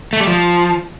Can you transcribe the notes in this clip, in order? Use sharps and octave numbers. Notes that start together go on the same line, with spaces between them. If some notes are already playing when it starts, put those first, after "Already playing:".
A3
G3
F3